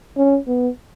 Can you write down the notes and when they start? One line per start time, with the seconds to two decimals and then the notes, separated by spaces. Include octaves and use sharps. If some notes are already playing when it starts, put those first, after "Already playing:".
0.17 C#4
0.47 B3